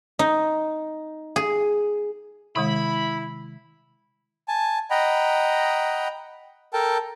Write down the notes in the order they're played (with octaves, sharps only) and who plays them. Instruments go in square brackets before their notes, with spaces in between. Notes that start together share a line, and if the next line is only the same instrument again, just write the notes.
[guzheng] D#4
G#4
[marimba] C3 D#3 G#3 [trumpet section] E4 [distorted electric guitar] B5
[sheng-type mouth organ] G#5 A5
D#5 F#5 G5 A#5 B5
A4 A#4 G5 A5